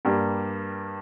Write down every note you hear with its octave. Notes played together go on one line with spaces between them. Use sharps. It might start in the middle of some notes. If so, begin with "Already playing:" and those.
G2 G3 A#3